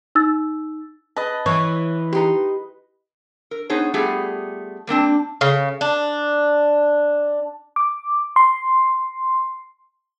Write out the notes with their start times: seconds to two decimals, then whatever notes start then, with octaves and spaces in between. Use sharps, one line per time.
0.15 D#4 E6 A6
1.16 B4 D#5 A5
1.46 E3 C#5
2.13 D#4 G4 A#5 C6
3.51 A#4
3.70 B3 D#4 G#4 C5 C#5
3.94 G3 A3 B3 F4 G4 G#4
4.87 G3 A#3 C4 D4
5.41 C#3
5.81 D4
7.76 D6
8.36 C6